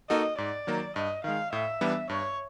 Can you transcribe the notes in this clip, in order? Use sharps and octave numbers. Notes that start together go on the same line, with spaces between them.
A#3 D#4 F#4 A4 D#5
G#2 D5
D#3 F#3 A#3
G2 D#5
D#3 G#3 F5
A2 E5
E3 G3 B3 D4
G2 C#5